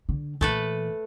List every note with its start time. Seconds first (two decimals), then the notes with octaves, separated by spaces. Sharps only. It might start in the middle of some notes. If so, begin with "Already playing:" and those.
0.09 D3
0.41 A#2 E3 A3 A4 B4